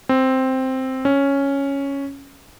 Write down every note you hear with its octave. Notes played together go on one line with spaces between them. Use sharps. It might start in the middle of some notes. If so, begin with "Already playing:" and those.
C4
C#4